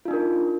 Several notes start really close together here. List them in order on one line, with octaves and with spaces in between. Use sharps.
F4 D#4 D4 A#4